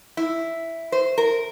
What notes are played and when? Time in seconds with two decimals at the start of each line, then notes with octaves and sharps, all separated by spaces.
0.17 E4
0.92 C5
1.18 A#4